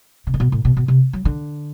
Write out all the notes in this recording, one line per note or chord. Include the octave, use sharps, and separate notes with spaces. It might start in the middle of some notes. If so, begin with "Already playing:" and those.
C3
A2
B2
A2
B2
B2
C3
F#3
D3